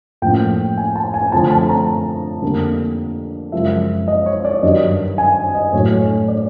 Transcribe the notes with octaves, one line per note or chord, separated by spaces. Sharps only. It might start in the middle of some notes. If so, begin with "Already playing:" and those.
A2 F3 A#3 C#4 G5
G#5
A5
G#5
D3 F3 A3 C4 A5
A5
A#5
F2 D3 G3 A#3
F#2 C#3 F3 G#3 E5
D#5
C#5
D5
G2 D#3 F#3 D#5
G#5
D#5
A2 F#3 A3 C#5
D5